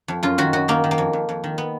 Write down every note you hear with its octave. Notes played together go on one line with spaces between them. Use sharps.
F2
F#2 F4
D#3 F#4
F#2 F#4
D#3 A#3
D#3
A#3
F2
F2
F2
D#3
B3